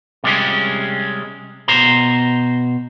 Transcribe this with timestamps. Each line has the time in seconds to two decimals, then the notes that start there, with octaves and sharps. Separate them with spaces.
0.24 C3 G3 G#3 C#4
1.68 B2 C5 A#5